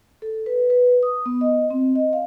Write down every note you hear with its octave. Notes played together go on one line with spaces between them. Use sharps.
A4
B4
B4
D#6
B3
D#5
C4
D#5
F5